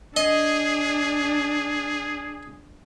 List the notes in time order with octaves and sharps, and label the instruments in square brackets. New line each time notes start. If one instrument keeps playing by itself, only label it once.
[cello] D4 [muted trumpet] G#4 [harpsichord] D#5